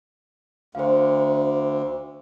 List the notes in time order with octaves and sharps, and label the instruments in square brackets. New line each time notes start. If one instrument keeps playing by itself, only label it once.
[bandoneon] D2 [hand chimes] C5 F5